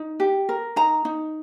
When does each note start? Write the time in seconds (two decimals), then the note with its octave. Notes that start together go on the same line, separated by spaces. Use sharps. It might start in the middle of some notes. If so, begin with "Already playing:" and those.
Already playing: D#4
0.20 G4
0.49 A#4
0.76 D#4 A#5
1.05 D#4